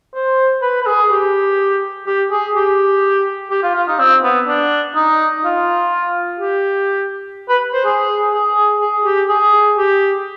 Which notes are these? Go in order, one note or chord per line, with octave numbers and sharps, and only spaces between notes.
C5
B4
B4
G#4
G4
G4
G#4
G4
G4
F4
F4
D#4
C4
B3
D4
D#4
F4
G4
B4
C5
G#4
G#4
G#4
G4
G#4
G4